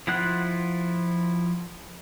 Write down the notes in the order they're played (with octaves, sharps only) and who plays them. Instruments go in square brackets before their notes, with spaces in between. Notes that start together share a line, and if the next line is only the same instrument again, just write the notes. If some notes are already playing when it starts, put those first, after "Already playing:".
[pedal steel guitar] F3 E4 F4 F#5 F#6